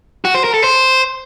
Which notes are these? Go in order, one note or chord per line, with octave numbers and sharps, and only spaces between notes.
F#4
C5
A#4
A4
C5